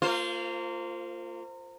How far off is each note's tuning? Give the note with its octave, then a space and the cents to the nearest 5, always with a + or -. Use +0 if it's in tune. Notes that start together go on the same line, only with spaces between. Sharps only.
A#3 -30 F4 +0 C5 +0